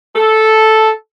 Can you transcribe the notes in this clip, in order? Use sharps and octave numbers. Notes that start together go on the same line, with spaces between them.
A4